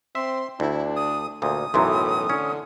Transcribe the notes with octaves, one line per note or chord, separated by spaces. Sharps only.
C4 E5 C6
D2 D4 E4
D#6
D2 A#2 D#6
B1 F#2 A2 E3 A#5 C6
D3 C#4